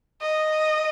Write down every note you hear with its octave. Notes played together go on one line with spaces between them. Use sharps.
D#5